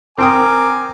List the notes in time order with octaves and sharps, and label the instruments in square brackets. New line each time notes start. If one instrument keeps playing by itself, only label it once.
[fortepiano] C4 G5 D#6 [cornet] A#4 [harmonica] G#5 D6